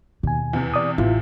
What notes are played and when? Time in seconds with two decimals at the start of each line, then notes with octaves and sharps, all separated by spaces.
0.23 D#2 B2 G#5
0.53 E2 C3 E3
0.74 D5 D#6
0.98 A1 E4 F4